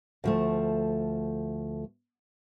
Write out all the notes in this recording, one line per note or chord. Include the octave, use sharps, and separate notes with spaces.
D2 F3 A3